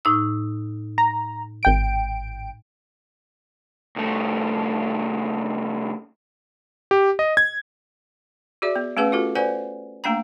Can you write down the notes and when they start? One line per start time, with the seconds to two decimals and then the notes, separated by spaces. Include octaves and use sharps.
0.05 A2 D#4 E6
0.98 A#5
1.63 G#1 G5 D7
3.96 C2 A3
6.91 G4
7.19 D#5
7.37 G#6
8.62 F#4 G#4 D5 E5
8.76 B3
8.97 A3 C#4 G#4 B4 F#5
9.12 F4 F#4 A4
9.35 B4 C5 D5 F#5 G#5
10.04 A3 A#3 D4 G5 A#5